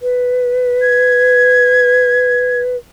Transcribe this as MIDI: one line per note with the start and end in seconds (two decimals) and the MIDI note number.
0.01 2.77 71
0.81 2.60 92